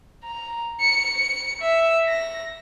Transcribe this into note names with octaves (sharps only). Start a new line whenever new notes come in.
A#5
C#7
C#7
E5
A#6